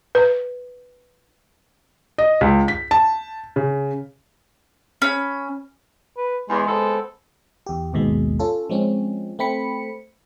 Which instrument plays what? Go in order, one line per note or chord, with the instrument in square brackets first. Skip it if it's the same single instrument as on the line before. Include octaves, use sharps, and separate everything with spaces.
[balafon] B4
[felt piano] D#5
C#2
B6
A5
C#3
[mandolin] C#4 B5
[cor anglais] B4
[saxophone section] E2 [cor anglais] G#3
[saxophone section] B3 C4 A4
[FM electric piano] E2 G4
G#1 D#2 B2 G#3
C#4 F4 A4
F3 G#3 C4 C#4
A3 C4 B5 C#7